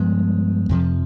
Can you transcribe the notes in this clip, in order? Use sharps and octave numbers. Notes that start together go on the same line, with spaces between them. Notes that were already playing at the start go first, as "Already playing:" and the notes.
Already playing: G2 F3 G#3 B3
F2 C3 F3